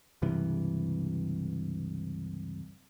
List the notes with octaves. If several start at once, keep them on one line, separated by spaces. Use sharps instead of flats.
C#2 G2 C3 E3